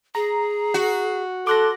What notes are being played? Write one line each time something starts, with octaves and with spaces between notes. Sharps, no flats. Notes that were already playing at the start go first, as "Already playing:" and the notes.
G#4 A#5
F#4
A4 C6 D6 F#6 A#6